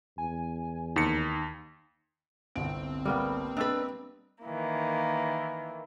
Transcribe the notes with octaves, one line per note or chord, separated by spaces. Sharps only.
E2 G#5
D#2 D#4 C#7
G1 C2 C4 D7
G3 A#3 B3
D4 B4 D#5 E6 A6
D#3 E3 A#3